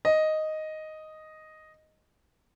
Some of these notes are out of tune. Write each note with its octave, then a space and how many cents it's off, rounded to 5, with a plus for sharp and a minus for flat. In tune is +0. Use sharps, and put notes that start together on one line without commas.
D#5 +0